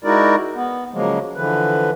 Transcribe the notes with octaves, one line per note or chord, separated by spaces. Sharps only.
G#3 D#4 E4 F#4 A#4 D5
B3
C#3 F3 F#3 G#3 A#3
D3 E3 F3 B4